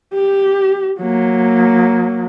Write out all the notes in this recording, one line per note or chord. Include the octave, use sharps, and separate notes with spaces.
G4
F#3 A#3